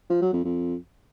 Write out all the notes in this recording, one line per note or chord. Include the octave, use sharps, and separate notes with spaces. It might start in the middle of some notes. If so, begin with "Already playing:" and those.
F3
F#3
F2
F2